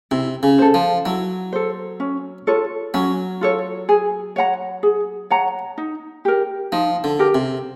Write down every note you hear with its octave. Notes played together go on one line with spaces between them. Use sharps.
C3 E4
C#3
A4 C5
F3
F#3 E4
A4 C5
C#4
F4 A4 C#5
F#3 C#4
F4 A4 C#5
G#4
C#5 F#5 A#5
G#4
C#5 F#5 A#5
D#4
G4 A#4
F3 D#4
D3
G4 A#4
C3